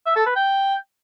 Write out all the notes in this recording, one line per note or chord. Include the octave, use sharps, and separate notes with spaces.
E5
A4
B4
G5